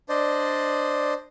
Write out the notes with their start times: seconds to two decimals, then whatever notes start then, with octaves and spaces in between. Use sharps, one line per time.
0.09 D4 C5 D5 D#5